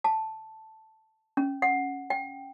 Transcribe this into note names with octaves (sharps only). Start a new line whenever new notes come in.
A5
C#4
F#5
G5